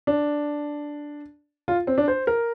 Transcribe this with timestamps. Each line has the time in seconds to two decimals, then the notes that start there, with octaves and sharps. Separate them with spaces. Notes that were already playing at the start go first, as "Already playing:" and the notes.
0.07 D4
1.68 F4
1.87 C4
1.98 D4
2.08 C5
2.27 A#4